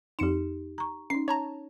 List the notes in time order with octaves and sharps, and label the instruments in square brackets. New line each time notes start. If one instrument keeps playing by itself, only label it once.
[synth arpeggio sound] F2 C#7 E7 [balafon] D#4 G4
[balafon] A#5 C#6
[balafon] C#4 D#4 [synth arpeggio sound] C7
[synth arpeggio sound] C#5 A5 A#5